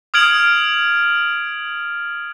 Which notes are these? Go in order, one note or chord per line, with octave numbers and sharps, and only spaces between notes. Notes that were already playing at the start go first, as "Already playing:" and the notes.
D#6 F6 G#6 D7 F#7